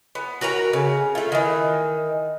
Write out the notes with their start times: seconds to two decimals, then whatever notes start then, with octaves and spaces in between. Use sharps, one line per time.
0.15 B3
0.41 F#4 A#4 B4 A#5
0.73 C#3
1.15 A3 F4
1.32 D#3 E3